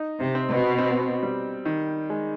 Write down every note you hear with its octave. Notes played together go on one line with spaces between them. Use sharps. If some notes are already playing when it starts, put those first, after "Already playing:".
Already playing: D#4
C3
C4
B2
C4
G3
D#3
G#3